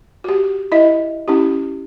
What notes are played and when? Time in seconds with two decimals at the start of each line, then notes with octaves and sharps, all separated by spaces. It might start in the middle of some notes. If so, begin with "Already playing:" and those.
0.24 F#4 G4
0.72 E4 D#5 E5
1.28 C#4 E4 G4